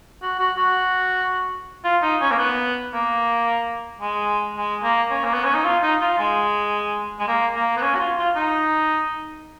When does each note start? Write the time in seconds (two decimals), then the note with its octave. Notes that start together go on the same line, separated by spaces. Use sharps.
0.22 F#4
0.39 F#4
0.57 F#4
1.84 F4
2.02 D#4
2.21 C#4
2.31 A#3
2.38 B3
2.94 A#3
4.01 G#3
4.57 G#3
4.83 A#3
5.10 C#4
5.24 A#3
5.34 B3
5.44 C#4
5.54 D#4
5.65 F4
5.82 D#4
6.01 F4
6.19 G#3
7.19 G#3
7.27 A#3
7.55 A#3
7.77 B3
7.82 C#4
7.95 F#4
7.99 F4
8.18 F4
8.36 D#4